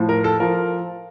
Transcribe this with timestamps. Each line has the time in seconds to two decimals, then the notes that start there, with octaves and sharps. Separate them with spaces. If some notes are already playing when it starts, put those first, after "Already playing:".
Already playing: A2 F3
0.09 A#4
0.24 A4
0.40 F3 A#4